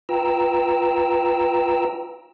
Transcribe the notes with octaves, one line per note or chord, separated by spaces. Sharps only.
F4 B4 G5 A#5 E6